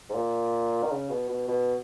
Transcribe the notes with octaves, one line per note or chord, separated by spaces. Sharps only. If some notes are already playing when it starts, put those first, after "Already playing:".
G#2
A#2
D#3
C#3
B2
B2
B2